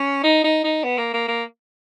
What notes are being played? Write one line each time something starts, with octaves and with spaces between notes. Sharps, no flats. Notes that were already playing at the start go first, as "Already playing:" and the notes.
Already playing: C#4
D#4
D#4
D#4
B3
A#3
A#3
A#3